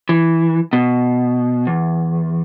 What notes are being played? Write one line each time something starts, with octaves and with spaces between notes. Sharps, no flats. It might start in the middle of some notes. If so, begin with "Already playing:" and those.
E3
B2
E2